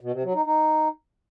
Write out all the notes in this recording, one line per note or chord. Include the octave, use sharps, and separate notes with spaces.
B2
C3
F#3
D#4
D#4